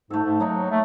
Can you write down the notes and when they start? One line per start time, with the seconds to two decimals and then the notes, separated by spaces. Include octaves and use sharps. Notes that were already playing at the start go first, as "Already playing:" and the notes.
0.10 G#2 A3 A4
0.24 G#2
0.40 F#3 A#3 D#4 C#5
0.71 A3